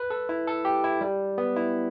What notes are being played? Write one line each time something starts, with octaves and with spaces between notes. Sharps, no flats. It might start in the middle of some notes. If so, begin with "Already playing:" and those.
Already playing: B4
A4
E4
A4
G4
E4
G3
B3
E4